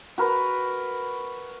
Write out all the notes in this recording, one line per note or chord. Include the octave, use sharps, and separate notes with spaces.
F#4 A#4 B4